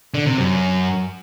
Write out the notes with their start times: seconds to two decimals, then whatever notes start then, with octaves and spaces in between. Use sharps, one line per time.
0.14 D3
0.26 C3
0.38 F#2